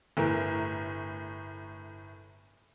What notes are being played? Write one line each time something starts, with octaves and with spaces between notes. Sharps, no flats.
G1 A2 A#4